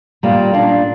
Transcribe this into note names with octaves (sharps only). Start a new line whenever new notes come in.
A#2 G3 A#3
A#2 A#3 D4